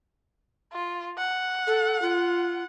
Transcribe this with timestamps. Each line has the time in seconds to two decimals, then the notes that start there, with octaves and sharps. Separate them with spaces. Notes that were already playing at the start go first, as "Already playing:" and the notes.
0.73 F4
1.18 F#5
1.67 A4
2.02 F4